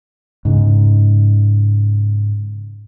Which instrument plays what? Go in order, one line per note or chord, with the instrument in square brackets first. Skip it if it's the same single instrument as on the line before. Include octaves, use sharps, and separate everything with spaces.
[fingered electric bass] G#2 C#3